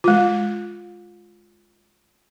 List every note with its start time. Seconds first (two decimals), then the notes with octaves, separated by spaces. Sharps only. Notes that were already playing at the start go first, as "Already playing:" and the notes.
0.04 G#3 F4